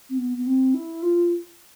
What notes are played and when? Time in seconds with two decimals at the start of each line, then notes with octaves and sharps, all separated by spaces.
0.10 C4
0.18 B3
0.38 B3
0.47 C4
0.74 E4
1.03 F4